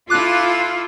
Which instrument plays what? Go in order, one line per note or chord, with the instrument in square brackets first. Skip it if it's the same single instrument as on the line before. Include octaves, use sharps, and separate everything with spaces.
[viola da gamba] E4 A4 [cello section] F4 [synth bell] D6 F#6